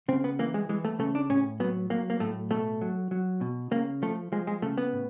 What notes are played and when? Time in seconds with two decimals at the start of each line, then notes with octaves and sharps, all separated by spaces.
0.08 C#3 C4
0.24 B3
0.39 E3 A#3
0.54 G#3
0.69 E3 G#3
0.85 A3
0.99 C#3 A3
1.15 D4
1.30 A2 C#4
1.60 F#3 B3
1.90 F#3 A#3
2.10 A#3
2.20 A2 A3
2.50 B2 A3
2.81 F#3
3.11 F#3
3.41 B2
3.71 C#3 A#3
4.02 F3 A3
4.32 F3 G#3
4.47 G#3
4.62 C#3 A3
4.78 B3
4.93 A2